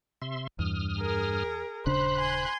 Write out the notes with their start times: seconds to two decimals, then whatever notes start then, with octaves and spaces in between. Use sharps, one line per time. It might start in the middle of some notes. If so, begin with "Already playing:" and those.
0.22 C3 E5 C6
0.59 E2 G2 D#6 F6
0.99 G#4 A#4
1.86 D#1 C#3 D4 C5 B5 F#6
2.18 G#5 C6